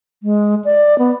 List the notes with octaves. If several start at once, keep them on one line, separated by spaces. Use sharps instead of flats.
G#3
D5
B3